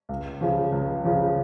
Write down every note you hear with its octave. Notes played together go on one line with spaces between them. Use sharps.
C#2
C#3 F3
C#2
C#3 F3